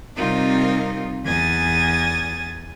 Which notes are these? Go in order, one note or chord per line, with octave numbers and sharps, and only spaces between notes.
C3 G3 C4 D#4 F4 A#4
E2 G#5 D#6 A6